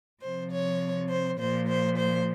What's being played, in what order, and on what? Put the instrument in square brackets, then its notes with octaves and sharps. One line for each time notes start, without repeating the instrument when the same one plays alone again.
[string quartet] C3 F3 C5
C#5
C5
A#2 F3 C5
C5
C5